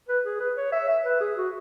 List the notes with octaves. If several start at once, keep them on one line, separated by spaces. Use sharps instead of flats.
B4
G#4
B4
C#5
E5
E5
B4
G#4
F#4